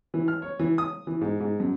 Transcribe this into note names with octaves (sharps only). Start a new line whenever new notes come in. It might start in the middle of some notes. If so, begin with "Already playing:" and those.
E3
F6
C#5
E3
D#6
E3
G#2
G#2
F#2